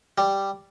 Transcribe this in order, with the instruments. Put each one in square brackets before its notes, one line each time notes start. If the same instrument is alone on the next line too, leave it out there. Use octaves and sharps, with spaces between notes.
[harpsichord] G3